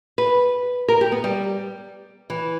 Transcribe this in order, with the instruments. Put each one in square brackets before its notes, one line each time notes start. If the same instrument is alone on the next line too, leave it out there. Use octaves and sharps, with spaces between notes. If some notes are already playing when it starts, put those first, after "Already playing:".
[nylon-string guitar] B4
A#4
G4
B3
G3
E3